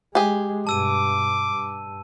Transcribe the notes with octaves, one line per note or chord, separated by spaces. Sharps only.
G#3 G4 G#4
G2 B2 A5 D6 E6 D#7
G2